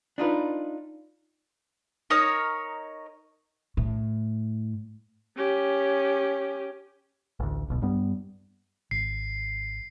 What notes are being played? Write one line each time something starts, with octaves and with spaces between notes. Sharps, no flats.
D4 D#4 F4 B4
D#4 A#4 C#5 D#6
A2
C#4 G4
A1 D2
D1 B1 B2
G2 G3 B3
G#1 C7